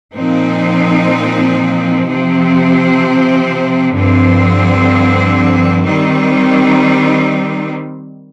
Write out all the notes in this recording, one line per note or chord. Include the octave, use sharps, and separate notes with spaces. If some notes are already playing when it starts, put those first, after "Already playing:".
A#2 F3 C4 D#4
C3 F3 C4
G2 D3 F3 C4
D#3 G3 C4 D#4